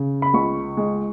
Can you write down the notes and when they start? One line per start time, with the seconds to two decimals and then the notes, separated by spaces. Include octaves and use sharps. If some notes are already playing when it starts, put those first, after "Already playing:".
Already playing: C#3
0.22 B5
0.34 C#2 C#6
0.77 G#3